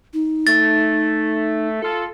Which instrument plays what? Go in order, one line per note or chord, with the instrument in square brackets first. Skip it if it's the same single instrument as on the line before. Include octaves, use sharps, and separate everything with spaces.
[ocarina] D#4
[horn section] A3 [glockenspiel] A6
[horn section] F4 A4